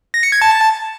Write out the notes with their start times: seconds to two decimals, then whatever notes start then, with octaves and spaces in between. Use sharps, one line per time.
0.14 A#6
0.23 C#7
0.32 G#6
0.42 A5